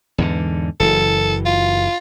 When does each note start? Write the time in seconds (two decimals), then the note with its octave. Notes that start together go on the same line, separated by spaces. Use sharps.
0.18 E2 G#2 D3
0.80 F#1 E3 A4
1.46 F4